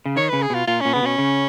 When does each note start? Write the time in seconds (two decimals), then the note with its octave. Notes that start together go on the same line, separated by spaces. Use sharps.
0.06 C#3
0.16 D#3 C#5
0.29 C#3 B4
0.42 G#4
0.50 B2 F4
0.68 A#2 F4
0.81 A#2 C#4
0.93 C#3 B3
1.03 B2 C#4
1.18 C#3